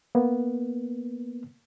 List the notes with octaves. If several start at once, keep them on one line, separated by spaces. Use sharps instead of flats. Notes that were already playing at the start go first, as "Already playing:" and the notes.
A#3 B3